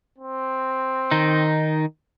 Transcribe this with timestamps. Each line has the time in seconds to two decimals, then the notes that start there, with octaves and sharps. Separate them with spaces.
0.18 C4
1.11 D#3 D#4